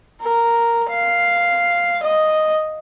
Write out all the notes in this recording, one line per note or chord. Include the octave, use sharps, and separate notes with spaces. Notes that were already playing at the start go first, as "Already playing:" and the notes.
A#4
F5
D#5